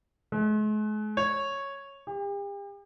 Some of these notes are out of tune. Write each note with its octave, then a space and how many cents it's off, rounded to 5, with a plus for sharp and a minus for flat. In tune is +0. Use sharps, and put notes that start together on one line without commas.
G#3 +45
C#5 -5
G4 +40